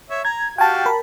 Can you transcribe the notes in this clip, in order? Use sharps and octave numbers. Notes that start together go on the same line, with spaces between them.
C#5 E5
A#5 G#6
F#4 G4 F5 G5 A5
A#4 B5